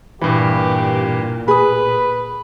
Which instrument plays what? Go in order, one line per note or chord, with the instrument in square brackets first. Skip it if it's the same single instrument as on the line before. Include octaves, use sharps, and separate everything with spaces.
[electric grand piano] G2 E3 [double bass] A#2 [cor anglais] G4 [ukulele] B4
[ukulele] G#4 [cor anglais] B4 [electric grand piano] B5 D#6